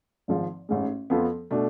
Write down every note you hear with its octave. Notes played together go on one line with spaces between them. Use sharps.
G#1 G#2 F3
A1 G#2 G#3
F2 F3 B3
B2 A3 D4